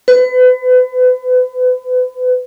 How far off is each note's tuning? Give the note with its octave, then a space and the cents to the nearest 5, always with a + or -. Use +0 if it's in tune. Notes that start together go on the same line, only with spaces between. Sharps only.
B4 +35